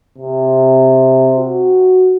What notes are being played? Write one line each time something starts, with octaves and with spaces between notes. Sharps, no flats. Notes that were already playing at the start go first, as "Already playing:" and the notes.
C3
F#4